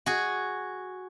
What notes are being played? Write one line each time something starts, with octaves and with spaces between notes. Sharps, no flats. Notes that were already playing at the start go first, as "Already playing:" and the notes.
F#4 G#4